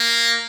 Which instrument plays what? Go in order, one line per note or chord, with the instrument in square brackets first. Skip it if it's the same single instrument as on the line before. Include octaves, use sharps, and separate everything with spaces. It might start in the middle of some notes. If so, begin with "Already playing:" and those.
Already playing: [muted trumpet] A#3